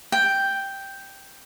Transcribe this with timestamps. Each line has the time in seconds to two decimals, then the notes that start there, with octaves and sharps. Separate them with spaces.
0.12 G5